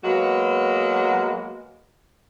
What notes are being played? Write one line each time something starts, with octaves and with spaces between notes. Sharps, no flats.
F#3 G#3 A#3 B3 F#4